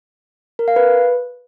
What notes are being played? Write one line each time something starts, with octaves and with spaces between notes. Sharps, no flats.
A#4
F5
B4